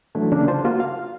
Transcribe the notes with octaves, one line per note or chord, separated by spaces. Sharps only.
E3 F#3 A3 D4 E4
C#3 A#3 C#4 D4
F4 C5 A5
A#3 F4 F#4
F5